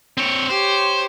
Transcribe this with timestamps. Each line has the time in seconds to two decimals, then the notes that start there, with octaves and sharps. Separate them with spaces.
0.18 C4 C#5
0.49 G4 C5 C#5